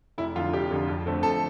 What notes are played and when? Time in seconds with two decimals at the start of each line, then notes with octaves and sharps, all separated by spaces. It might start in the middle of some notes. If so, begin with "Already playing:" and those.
0.18 F1 E4
0.36 F2 D3 F4
0.53 F1 G4
0.71 F2 D3
0.88 F2
1.06 D3 A3 C4
1.23 F2 A4